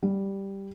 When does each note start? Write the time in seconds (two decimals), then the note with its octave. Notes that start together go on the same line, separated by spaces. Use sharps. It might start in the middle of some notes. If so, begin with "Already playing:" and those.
0.03 G3